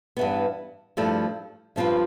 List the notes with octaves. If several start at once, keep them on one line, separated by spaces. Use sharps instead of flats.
G2 E3 B3
G2 F3 A3 E4
G2 F3 C4 F4 B4